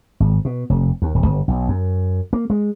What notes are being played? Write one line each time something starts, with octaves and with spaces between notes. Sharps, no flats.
G#1
B2
F1
D#2
D#1
G1
B1
F#2
A#3
G#3